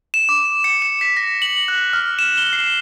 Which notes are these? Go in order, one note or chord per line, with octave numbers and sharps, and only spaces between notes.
E7
D6
C#7
E7
B6
A#6
F#7
F#6
F6
E7
G7
C7